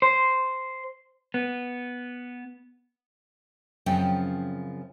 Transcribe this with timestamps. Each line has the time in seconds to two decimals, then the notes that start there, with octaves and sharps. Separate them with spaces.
0.02 C5
1.34 B3
3.86 F#2 C#3 F3 C4 C#4 G5